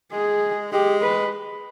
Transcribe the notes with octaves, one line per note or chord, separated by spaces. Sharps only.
G#3 G#4
G#3 G4
B4